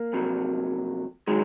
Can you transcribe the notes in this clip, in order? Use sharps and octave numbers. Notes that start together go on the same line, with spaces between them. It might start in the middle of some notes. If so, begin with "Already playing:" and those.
Already playing: A#3
F2 C3 F#3
D#3 F#3 G#3